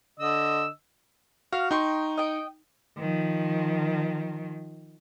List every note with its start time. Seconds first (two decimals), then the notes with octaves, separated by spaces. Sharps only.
0.20 D3 D#5 E6
1.52 F#4 F5
1.71 D#4 G5 C6 C#6
2.18 D#5 G5
2.98 D#3 F3